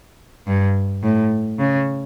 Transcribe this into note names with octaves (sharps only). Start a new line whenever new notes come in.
G2
A2
C#3